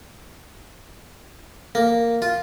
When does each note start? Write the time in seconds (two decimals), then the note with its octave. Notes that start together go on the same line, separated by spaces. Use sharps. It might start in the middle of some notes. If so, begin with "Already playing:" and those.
1.75 A#3
2.22 F4